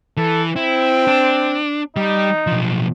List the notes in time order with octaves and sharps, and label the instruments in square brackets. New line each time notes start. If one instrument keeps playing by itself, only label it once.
[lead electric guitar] E3 [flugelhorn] A4
[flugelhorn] C4 [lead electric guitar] E4
[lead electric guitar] D4
[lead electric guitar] G3 [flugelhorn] D#4
[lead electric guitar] B1 F3